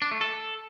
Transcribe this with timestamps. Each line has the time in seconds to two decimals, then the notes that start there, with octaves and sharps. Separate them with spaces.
0.02 D4
0.11 A3
0.21 A4